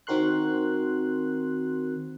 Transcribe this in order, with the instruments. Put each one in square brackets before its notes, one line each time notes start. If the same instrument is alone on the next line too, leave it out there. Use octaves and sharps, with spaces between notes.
[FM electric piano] D#3 C4 F#4 A#4 C6 F#6